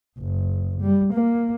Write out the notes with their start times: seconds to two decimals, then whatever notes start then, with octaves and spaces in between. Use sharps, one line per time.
0.19 F#1
0.82 G3
1.14 A#3